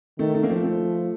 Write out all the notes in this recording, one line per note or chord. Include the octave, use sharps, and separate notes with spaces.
D#3 A3
A3
A#3
F3 A3 C4
A3